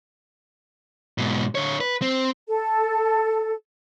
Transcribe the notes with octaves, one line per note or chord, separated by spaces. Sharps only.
G#2 B2
D3 C#5
B4
C4
A4